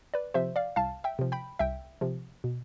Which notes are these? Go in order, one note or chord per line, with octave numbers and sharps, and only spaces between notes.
B4 D5
C3 F3 C5 E5
D5 F5
C2 F5 A5
E5 G5
C3 F3
G5 B5
C2 E5 G5
C3 F3
B2